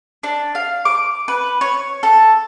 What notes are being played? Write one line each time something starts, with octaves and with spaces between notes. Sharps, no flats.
D4
F5
D6
B4
C#5
A4